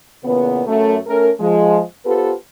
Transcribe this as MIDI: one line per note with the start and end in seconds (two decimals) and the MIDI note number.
0.25 0.61 40
0.25 0.61 46
0.25 0.61 49
0.25 0.61 59
0.67 0.97 42
0.67 0.97 57
1.07 1.30 57
1.07 1.30 61
1.07 1.30 69
1.07 1.30 70
1.40 1.81 53
1.40 1.81 56
2.05 2.32 59
2.05 2.32 65
2.05 2.32 67
2.05 2.32 69
2.05 2.32 71
2.05 2.32 72